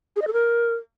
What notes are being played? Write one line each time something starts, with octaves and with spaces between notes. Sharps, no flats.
G#4
D#5
A4
A#4